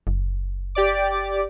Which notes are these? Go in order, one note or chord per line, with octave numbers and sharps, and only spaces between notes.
F#1
G4 D5 D6